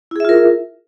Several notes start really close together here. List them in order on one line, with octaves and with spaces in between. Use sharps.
E4 G#4 E5 F4 A#4